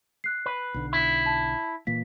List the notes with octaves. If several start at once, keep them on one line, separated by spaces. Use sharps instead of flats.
F#6 C7
B4
B1 D3
E4
A5
A#2 E3 A#3 B6